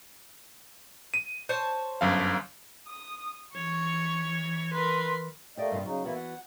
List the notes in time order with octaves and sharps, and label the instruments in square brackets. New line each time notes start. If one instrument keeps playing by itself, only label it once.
[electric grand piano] D#7
[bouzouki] C5 C#5 A5
[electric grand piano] G1 F#2 F5
[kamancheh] D#6
[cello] E3 [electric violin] C#5 [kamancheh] C#6
[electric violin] A#4 B4 [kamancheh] C6
[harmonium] A3 A#3 D#5 [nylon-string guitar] G4 D5
[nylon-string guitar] G2 C3 F4
[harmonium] C#3 D#4 [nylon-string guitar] F#3
[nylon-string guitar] E3 B3 F#4 [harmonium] A#3 E4
[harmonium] F#5